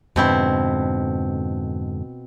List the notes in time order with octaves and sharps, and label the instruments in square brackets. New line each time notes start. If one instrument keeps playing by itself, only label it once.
[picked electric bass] F2 G#2 D3 [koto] B2 C4 E4